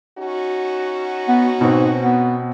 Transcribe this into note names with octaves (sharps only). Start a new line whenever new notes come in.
C#4 D#4 F#4
B3
G#2 B2 C4
B3